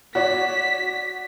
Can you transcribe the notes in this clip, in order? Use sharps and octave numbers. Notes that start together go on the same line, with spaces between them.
F#4 C#5 D5 B6